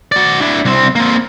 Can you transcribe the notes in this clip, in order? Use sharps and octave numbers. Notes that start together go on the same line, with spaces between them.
F#4 D5
D4 E4
C2 C4
A#3 C4